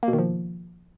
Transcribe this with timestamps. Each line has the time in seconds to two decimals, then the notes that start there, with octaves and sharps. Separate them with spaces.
0.03 A#3
0.08 B2
0.13 D#3
0.19 F3